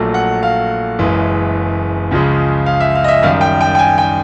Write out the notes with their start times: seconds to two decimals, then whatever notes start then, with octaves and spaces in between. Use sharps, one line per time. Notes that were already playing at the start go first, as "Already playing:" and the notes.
Already playing: A#1 A#2 F#3 A3
0.14 F#5
0.43 F5
0.98 F#1 F#2 C#3 E3 G#3
2.11 C#2 C#3 F3 G#3
2.66 F5
2.80 E5
2.95 F5
3.04 D#5
3.08 E5
3.23 F#2 D#3 G3 F5
3.41 G5
3.61 G5
3.75 G5
3.79 G#5
3.98 G5